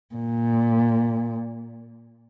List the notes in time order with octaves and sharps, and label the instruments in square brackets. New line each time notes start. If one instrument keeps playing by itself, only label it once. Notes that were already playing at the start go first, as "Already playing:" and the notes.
[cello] A#2